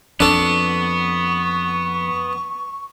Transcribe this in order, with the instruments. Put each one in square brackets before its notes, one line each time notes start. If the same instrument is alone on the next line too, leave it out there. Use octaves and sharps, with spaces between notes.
[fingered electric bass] F2 [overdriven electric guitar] B3 [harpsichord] D4 A4 [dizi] C#6